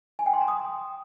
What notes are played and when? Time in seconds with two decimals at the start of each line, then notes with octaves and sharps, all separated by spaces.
0.19 G#5
0.26 G5
0.33 C6
0.41 A#5
0.48 D#6